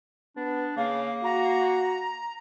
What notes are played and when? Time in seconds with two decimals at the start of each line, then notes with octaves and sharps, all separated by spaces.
0.36 B3 D4
0.77 C#3 A#3 F5
1.24 F#4 A#5